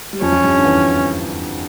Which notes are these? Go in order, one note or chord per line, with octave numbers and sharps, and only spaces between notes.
G3
F2 F3 C#4
F2 F3
G2 G3
D3
E2 E3